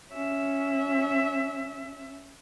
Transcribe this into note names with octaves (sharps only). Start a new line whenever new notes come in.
C#4 E5